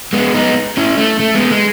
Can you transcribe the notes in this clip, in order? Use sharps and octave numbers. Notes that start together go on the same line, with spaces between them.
G#3 B3
B3 D#4
C#4 E4
A3
A3
G#3 B3
G#3